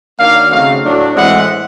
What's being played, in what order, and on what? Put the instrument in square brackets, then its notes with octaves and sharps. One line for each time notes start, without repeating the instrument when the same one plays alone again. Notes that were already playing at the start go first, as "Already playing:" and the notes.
[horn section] D#3 F#3 A#3 D4 F5
C#3 F#3 A3 C4 D#4 F5
A2 F#3 A3 D4
A2 E3 G#3 C4 E4 F#5